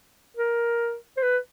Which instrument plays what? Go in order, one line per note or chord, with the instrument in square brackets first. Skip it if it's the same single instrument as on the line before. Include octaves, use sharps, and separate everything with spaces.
[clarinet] A#4
C5
B4